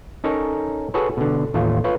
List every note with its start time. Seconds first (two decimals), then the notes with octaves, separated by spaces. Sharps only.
0.24 C#4 D#4 A4 A#4 C#5
0.94 F#4 G#4 A4 B4 C#5
1.17 B2 D3
1.54 A1 D#2 A3 F4 C#5
1.84 F4 B4 C#5